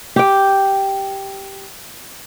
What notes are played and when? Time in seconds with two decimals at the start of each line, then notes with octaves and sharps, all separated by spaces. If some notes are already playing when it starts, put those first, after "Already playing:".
0.16 G4 G5